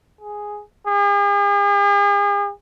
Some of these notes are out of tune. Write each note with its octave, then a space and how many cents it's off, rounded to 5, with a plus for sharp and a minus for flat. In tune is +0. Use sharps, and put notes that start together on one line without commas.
G#4 +0
G#4 -45